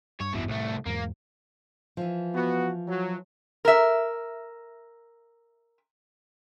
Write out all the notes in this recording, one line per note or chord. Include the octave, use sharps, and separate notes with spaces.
G2 C#5
E1 A1 G2 B2 E3
C2 A2 A3
E2 G#2 A#3
E3 F3
B3 F#4
F#3
A#4 E5